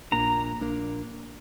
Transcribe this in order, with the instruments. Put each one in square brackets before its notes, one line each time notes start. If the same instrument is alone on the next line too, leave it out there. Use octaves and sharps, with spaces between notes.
[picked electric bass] A#1 A#2 A#3 D4 [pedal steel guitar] A#5
[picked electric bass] A#1 A#2 A#3 D4